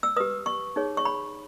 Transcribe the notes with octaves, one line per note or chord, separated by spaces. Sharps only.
E6
G4 B4 D#6
C#6
D#4 G#4 C#5
C#6
B5